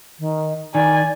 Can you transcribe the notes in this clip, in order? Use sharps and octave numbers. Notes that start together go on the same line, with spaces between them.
D#3
D#3 D5 G#5